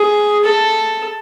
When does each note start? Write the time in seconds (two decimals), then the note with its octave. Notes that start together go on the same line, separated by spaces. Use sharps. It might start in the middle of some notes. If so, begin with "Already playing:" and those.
Already playing: G#4
0.44 A4